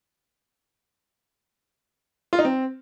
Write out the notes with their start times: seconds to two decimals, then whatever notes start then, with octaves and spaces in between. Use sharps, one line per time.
2.33 F4
2.39 D#4
2.45 C4